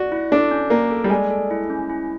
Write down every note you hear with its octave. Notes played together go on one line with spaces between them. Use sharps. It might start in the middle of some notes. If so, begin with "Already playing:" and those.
Already playing: F#4 D5
E4
D4 A4
C#4
A#3 D5
A4
G3
G#3 D5
A4
E4
C#4
E4